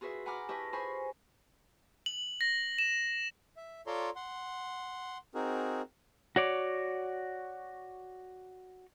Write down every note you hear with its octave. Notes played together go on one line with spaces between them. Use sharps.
F4 F#4 G#4 B4 E5
F#5 G#5 A#5 B5 D6 F6
E4 G4 B4 D#5 A5 C#6
F4 G#4 C5 G#5 B5 C#6
F#7
A#6
E7
E5
F4 A4 C#5 D5 A#5 C6
F#5 C6
C4 D#4 F#4 G#4 A#4
F#4 C#5 D5